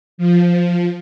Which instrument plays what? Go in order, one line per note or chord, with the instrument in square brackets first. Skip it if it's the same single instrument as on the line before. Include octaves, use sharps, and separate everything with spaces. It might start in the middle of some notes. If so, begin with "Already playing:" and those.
[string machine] F3